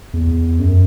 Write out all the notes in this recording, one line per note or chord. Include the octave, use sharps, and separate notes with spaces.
E2
F#2